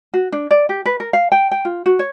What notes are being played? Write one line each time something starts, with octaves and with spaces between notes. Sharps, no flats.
F#4
D4
D5
G4
B4
A#4
F5
G5
G5
F4
F#4
C#5